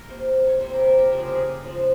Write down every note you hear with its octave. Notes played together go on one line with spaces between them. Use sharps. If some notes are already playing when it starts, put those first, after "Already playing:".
Already playing: A#4
C3 G3 A#3 C5
C#5
C3 G3 A#3 C5
A#4
A#4
G4
C#3 F3 G#3 A#4
G#4
G4
G#4
C#3 F3 G#3